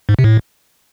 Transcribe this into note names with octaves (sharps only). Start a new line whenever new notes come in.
G#2
C3
A2